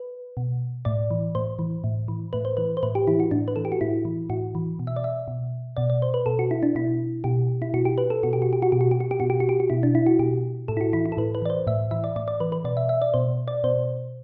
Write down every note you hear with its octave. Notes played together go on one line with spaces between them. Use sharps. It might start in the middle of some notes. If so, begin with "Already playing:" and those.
Already playing: B4
B2
A2 D5
E3
A2 C5
E3
A2
E3
A2 B4
C5
E3 B4
C5
A2 B4
G4
E3 E4
F#4
A2 D4
B4
E3 A4
G4
F#4
A2 E4
E3
A2 F#4
E3
B2
E5
D5
E5
B2
B2 D5
D5
C5
B4
B2 A4
F#4
E4
D4
B2 E4
B2 G4
E4
B2 F#4
G4
B4
A4
B2 F#4
G4
F#4
G4
F#4
B2 G4
F#4
G4
F#4
G4
B2 F#4
G4
F#4
G4
F#4
B2 E4
D4
E4
F#4
B2 G4
A2 A4
E4
F#4
E3 E4
E4
A4
A2 B4
B4
E3 D5
C5
A2 E5
E3 E5
D5
A2 D5
D5
E3 B4
B4
B2 D5
E5
E5
D5
B2 C5
D5
B2 C5